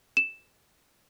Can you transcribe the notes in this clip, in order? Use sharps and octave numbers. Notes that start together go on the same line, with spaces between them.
E7